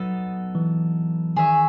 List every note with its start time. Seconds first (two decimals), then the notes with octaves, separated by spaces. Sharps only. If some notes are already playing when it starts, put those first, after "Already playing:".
Already playing: F#3 B3 D#4 A4
0.55 E3
1.36 D#3 G#4 C#5 E5